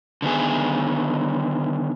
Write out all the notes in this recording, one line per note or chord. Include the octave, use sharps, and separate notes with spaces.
D3 D#3 B3 G#4